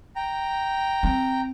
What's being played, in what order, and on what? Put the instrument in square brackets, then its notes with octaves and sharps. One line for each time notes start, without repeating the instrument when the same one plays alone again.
[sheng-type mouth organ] G5 A#5
[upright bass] C4